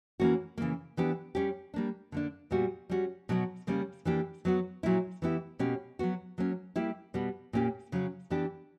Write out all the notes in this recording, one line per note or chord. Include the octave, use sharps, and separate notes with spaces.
E3 A#3 C#4 F#4
C#3 E3 A#3
E3 B3 D4 G4
G3 C#4 G4
G3 A#3 D4
D3 A#3 D4
A#2 G3 B3 F#4
G3 C#4 F#4
B2 F#3 B3 F#4
C#3 G3 A#3 C#4
E3 A#3 D4 G4
F#3 B3 F#4
A#2 F#3 A#3 E4
E3 B3 E4 G4
B2 A#3 C#4 G4
F#3 B3 F#4
F#3 A#3 C#4
G3 A#3 E4 G4
B2 G3 B3
A#2 A#3 C#4 G4
C#3 F#3 C#4
E3 B3 D4 G4